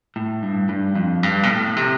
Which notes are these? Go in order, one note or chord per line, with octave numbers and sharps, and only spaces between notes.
A2
G2
G2
F2
G2
B2
A2
C3